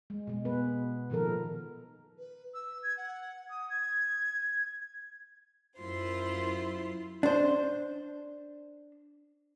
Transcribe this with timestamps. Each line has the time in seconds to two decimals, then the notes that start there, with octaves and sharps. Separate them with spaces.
0.10 G#3
0.27 B2 G#3
0.45 B3 B4
1.10 A#2 D#3 F3 A4 A#4
2.18 B4
2.54 E6
2.83 G#6
2.97 F#5
3.50 D#6
3.70 G#6
5.78 F#2 E4 F4 C5 C6
7.23 D4 C5